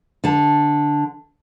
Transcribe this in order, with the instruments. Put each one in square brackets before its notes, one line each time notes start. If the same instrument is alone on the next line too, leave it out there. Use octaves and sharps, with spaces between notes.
[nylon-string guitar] D3 A5